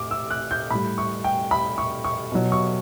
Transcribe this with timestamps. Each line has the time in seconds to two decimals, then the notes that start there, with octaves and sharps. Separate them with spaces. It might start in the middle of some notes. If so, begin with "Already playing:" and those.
Already playing: A2 D6
0.11 E6
0.31 F#6
0.51 G6
0.71 A2 G3 B5
0.98 C#6
1.24 G5
1.51 B5
1.78 C#6
2.04 C#6
2.32 B2 F#3
2.52 C#6